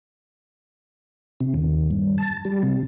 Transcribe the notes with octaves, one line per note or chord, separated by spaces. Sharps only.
C3
D#2
G2
A5
G3
C3